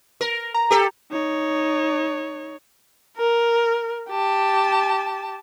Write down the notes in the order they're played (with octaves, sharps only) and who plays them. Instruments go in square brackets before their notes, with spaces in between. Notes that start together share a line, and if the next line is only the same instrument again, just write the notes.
[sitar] A#4
[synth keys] A#5
[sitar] G4 A4
[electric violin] D#4 C#5
[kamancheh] A#4
G4 A5